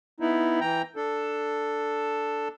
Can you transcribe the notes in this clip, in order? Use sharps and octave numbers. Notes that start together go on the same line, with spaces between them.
B3 D#4 E4
E3 G5 A#5
D4 A4